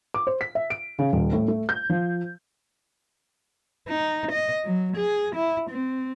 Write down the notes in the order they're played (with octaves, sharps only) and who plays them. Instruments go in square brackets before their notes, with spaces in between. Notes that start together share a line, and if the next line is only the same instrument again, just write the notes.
[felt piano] D6
C5
B6
E5
D7
C#3
D#1
A2
A3
G6
F3
[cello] D#4
D#5
F#3
G#4
E4
C4